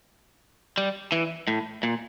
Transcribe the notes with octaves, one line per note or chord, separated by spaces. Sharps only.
G3
E3
A2
A#2